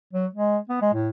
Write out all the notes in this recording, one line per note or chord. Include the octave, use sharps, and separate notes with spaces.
F#3
G#3
B3
G#3
A2